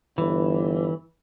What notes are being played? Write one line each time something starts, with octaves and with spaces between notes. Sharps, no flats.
G1 E3